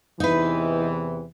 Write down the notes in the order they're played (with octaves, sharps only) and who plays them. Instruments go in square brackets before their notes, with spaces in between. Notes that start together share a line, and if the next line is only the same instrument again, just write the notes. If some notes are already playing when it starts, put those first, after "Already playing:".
[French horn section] E2 C3 E3 [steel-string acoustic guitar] D#4 B4